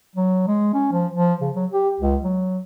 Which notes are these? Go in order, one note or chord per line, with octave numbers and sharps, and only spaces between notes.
F#3
G#3
C#4
F3
F3
C#3
F#3
G4
C#2
F#3